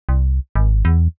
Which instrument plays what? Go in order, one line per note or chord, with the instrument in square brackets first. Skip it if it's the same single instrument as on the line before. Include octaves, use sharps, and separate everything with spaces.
[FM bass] C2
G#1
E2